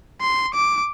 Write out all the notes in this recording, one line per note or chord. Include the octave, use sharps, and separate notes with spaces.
C6
D6